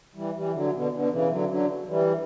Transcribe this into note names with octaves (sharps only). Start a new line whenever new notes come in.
E3 G3
E3 G3
D3 F#3
B2 D3
B2 D3
C#3 E3
D3 F#3
D3 F#3
E3 G3